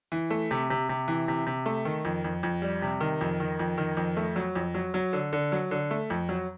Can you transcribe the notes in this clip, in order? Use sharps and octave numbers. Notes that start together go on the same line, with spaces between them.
E3
A3
C3
C3
C3
E3
C3
C3
A3
D#3
F2
F2
F2
G3
C3
D#3
F2
D#3
F2
D#3
F2
A3
F#3
F2
F#3
F#3
D3
D3
F#3
D3
A3
F2
F#3